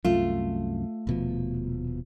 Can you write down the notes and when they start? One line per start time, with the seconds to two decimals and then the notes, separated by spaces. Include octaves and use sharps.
0.05 C2 F#2 A3 F4
1.07 D#1 B2 F3